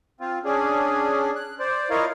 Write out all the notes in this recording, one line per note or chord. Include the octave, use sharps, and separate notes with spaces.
C4 F4
C#4 D4 G#4
F#6
C5 D5
E4 F4 A#4 C#5 D#5 F5